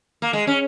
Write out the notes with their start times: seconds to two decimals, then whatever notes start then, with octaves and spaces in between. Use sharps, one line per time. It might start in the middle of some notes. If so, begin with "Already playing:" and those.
0.22 A#3
0.33 G#3
0.47 C#4